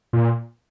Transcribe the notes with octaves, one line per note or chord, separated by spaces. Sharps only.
A#2